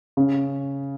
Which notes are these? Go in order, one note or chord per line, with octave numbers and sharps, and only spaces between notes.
C#3